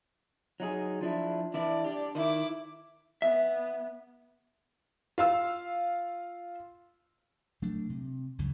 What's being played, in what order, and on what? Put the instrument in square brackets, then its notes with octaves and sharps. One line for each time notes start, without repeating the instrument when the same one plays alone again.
[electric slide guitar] F#3 D#4 G#4
F3 D4 E4
[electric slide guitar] E3 D4 E4 [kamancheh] D5
[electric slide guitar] D4 G4
[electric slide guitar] D#3 [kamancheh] E4 D6
[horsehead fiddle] B3 [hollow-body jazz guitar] E5
[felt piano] F4 F5 E6
[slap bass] F#3 A3 D4
C3
C#2 F#2 C#3